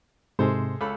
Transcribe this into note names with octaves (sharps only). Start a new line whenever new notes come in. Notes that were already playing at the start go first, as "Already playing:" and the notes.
G#2 C3 G#3 A4 C5
C#2 A4 B5